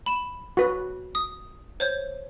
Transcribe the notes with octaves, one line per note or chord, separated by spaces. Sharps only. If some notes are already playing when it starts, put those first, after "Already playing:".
B5 E7
F#4 B4
D#6
C5 C#5 G6